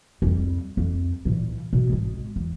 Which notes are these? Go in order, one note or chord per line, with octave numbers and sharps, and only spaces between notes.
F2 G3
F2
A#2 E3
B2
G#1 G#3
E2